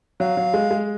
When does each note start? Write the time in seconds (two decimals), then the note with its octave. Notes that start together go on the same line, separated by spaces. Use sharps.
0.20 F#3 F5
0.37 F#3
0.54 G#3
0.71 G#3